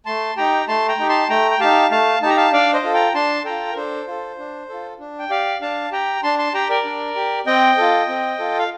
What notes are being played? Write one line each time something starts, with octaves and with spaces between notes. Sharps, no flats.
A3 A5 C6
D#4 G4 G5 A#5
A3 A5 C6
G5 A#5
D#4 G4
A5 C6
A3 G5 A#5
G5
D#4 G4 F5 A5
A3 F5 A5
D#4 G4 A5 A#5
F5 A5
D4 D5 F5
C5 D#5
F4 A4
G5 A#5
D4 A5 C6
F4 A4 G5 A#5
A#4
D4 A4 C5
F4 A4
D4
F4 A4
D4
G5
G4 D5 F5
D4 F5 A5
G4 G5 A#5
D4 A5 C6
A5 C6
G4 G5 A#5
A#4 D5
D4
G4
C4 D#5 G5
F4 A4
C4
F4 A4
F5